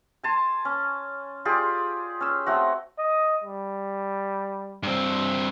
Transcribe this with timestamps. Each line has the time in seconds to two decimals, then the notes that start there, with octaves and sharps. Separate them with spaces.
0.23 G#5 A5 C6
0.65 C#4
1.45 F4 G4 G#4 D5
2.20 C#4 E6
2.46 A3 C4 F#4
2.98 D#5
3.44 G3
4.83 G2 C4